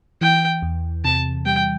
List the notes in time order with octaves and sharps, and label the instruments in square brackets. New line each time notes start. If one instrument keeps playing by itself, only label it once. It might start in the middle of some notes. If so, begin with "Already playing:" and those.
[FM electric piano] E3 [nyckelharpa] G5
[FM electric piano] E2
[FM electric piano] C3 [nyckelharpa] A5
[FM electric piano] G3 [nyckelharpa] G5